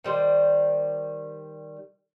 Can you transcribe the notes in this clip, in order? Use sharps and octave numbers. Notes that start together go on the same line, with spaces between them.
D#3 G3 C5